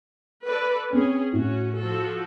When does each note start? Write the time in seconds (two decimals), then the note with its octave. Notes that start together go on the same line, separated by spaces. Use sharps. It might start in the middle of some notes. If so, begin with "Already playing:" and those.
0.44 A4 B4 D5
0.93 C4 C#4 G#4
1.33 A2 C#4 F#4
1.77 F3 F#4 A4